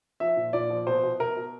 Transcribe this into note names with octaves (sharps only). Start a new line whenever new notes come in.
F3 E5
A#2
A#2 D5
F3
B2 C5
B2
B2 A#4
B2